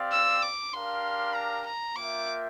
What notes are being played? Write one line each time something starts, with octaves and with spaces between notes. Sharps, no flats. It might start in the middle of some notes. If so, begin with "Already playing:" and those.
Already playing: C4 G4 D5 F5
E6
D6
D4 G4 A#4 F5 C6
A#5
A#5
A#3 F4 A#4 E5 G5 D6